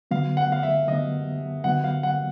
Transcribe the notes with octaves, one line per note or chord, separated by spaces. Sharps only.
D3 F#3 B3 F5
F#5
F5
E5
D3 F#3 B3 D#5
D3 F#3 B3 F#5
F5
F#5